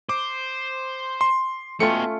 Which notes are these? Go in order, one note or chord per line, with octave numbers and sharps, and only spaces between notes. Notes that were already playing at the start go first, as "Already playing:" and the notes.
C5 D6
C6
B2 A3 C#4 F4 G5 C#7